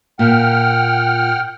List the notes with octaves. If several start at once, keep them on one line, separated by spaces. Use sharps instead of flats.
A#2 F#5 G5 F6